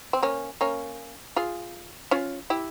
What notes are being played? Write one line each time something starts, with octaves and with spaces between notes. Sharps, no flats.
C4
A#3 C#4
A#3 C#4
F4 G#4
C#4 F4
E4 G4